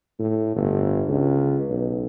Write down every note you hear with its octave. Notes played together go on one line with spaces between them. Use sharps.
A2
G1
C#2
B1